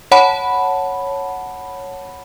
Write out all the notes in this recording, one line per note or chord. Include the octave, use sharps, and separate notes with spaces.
C#5 F#5 A5 B5